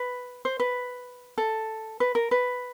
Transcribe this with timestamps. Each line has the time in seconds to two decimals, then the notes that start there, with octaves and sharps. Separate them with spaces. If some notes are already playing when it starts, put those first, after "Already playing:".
Already playing: B4
0.45 C5
0.60 B4
1.38 A4
2.00 B4
2.15 A#4
2.31 B4